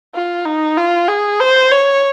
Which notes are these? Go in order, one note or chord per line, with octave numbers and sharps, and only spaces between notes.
F4
D#4
F4
G#4
C5
C#5